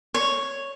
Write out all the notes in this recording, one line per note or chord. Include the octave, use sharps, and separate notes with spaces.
C#5